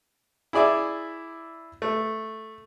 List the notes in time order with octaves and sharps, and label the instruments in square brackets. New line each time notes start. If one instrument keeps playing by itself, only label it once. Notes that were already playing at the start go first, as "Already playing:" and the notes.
[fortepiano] E4 G#4 D5 E5
A3